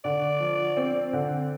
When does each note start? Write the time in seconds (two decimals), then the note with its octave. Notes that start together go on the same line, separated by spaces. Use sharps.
0.04 D3 D5
0.40 F3
0.77 C4
1.13 D3